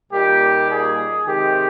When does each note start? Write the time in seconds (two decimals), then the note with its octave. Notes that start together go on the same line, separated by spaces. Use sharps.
0.11 A#2 G3 A#3 D#4 G4
0.69 G#4
1.26 C3 D#3 G#3 C4 G4